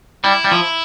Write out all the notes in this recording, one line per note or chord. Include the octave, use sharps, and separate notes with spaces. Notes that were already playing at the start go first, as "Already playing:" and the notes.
G3 E4
G3
F3